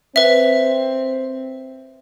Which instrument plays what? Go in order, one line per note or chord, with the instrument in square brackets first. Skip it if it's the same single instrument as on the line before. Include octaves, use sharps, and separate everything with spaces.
[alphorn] C4 [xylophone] B4 E5